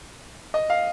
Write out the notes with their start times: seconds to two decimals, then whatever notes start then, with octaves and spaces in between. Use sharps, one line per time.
0.54 D#5
0.70 F5